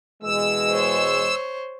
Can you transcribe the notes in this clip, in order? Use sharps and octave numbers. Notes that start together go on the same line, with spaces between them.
B2 E3 G#3 E6
C5 C#5